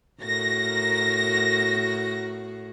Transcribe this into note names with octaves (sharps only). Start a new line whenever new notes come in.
A2 F#4 A#4 A#6